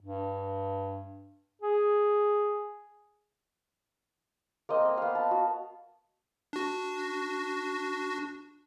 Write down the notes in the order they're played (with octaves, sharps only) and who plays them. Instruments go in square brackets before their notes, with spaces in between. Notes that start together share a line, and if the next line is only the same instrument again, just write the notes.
[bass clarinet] G2
G#4
[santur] A#3 C4 D#5 G5
A#3
B3 F5
A5
F#4
[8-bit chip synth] D4 F#4